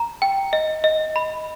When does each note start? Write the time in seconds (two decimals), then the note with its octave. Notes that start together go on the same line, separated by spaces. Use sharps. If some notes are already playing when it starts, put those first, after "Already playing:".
Already playing: A#5
0.22 G5
0.53 D#5
0.84 D#5
1.16 B5